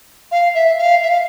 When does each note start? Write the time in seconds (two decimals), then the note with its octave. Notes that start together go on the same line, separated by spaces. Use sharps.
0.31 F5
0.54 E5
0.78 F5
1.02 E5
1.10 F5